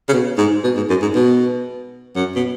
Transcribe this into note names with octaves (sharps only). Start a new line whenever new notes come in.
C#3
B2
G#2
B2
G#2
F#2
G#2
B2
F#2
B2